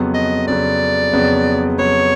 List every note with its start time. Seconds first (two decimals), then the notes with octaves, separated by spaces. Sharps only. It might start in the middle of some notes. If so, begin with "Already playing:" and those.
Already playing: F2 C#3 F#3 B3
0.14 D#5
0.47 F2 C#3 F#3 B3 D5
1.13 F2 C#3 F#3 B3
1.78 F2 C#3 F#3 B3 C#5